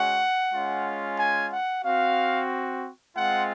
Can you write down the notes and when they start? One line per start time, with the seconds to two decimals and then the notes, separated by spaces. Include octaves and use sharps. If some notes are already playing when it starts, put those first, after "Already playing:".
Already playing: G#3 C#4 F#4 F#5
0.52 G#3 C#4 F4
1.17 G#5
1.51 F#5
1.83 C4 F#4 F5
3.15 G#3 C4 F4 F#5